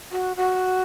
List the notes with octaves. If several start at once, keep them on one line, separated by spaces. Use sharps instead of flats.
F#4
F#4